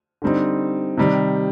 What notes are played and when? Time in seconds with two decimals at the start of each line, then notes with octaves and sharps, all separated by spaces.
0.22 D3 G3 C4 D#4
0.97 C3 D#3 G3